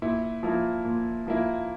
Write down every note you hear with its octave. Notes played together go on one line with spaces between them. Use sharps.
A#2 E4
F3 A#3 E4
A#2
F3 A#3 E4